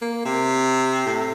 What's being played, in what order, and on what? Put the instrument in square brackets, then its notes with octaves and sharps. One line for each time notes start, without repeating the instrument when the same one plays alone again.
[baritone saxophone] A#3
C3
A2